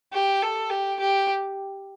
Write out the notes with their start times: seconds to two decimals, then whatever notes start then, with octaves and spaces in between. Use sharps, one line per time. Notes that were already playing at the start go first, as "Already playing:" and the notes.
0.13 G4
0.42 A4
0.70 G4
0.99 G4